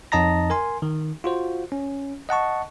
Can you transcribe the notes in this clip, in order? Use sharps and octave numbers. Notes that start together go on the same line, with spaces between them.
F2 D#4 D#5 A5 A#5 A#6
A#4 G#5 C6
D#3
F4 F#4 C5
C#4
D#5 F#5 A5 C#6